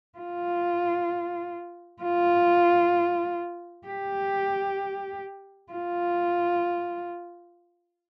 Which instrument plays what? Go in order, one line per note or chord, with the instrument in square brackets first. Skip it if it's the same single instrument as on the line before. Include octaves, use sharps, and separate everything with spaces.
[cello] F4
F4
G4
F4